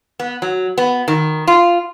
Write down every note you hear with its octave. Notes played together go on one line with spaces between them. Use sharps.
B3
F#3
B3
D#3
F4